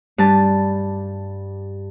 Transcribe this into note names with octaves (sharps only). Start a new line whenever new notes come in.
G2 A5